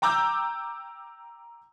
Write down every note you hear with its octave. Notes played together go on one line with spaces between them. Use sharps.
G5 A#5 D6 E6 G6